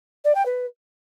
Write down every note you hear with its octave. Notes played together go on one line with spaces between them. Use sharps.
D5
G5
B4